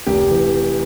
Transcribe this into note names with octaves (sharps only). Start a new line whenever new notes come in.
F1 G4
E3